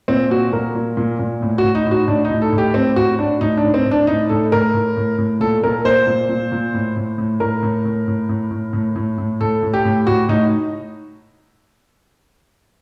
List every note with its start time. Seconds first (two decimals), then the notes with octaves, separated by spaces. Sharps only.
0.08 A#2 C4
0.30 A#2 F#4
0.53 A#2 A#4
0.75 A#2
0.97 A#2
1.19 A#2
1.42 A2
1.58 F#4
1.64 A2
1.75 D#4
1.86 A2
1.91 F#4
2.08 A2 D4
2.25 D#4
2.30 A2
2.42 A4
2.52 A2
2.58 G4
2.74 A2 C4
2.96 A2 F#4
3.19 A2 D4
3.41 A2 D#4
3.57 D4
3.64 A2
3.74 C4
3.86 A2
3.91 D4
4.07 A2 D#4
4.29 A2 A4
4.52 A2 A#4
4.74 A2
4.97 A2
5.18 A2
5.40 A#2 A4
5.64 A#2 A#4
5.85 A#2 C5
6.07 A#2
6.29 A#2
6.52 A#2
6.74 A2
6.96 A2
7.18 A2
7.40 A2 A#4
7.63 A2
7.85 A2
8.08 A2
8.29 A2
8.51 A2
8.73 A2
8.96 A2
9.18 A2
9.40 A2 A4
9.63 A2
9.74 G4
9.85 A2
10.07 A2 F#4
10.29 A2 D#4